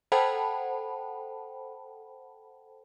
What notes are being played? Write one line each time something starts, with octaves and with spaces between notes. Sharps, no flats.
A4 C5 F#5 G5 A5 B5